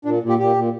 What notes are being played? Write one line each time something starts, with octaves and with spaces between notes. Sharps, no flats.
A#2 D4
A#2
G4
A#2 G4
A#2